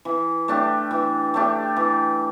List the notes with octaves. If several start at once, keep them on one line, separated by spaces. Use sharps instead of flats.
E3
A3 D4 G4
E3
A3 D4 G4
E3